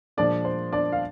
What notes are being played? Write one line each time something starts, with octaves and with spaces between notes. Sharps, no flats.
A#2 F3 G#3 D4 D5
C5
D4 D5
F5